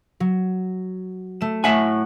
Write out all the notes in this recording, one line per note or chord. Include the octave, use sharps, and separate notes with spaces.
F#3
A3 E7
A2 E5 F#5 G#5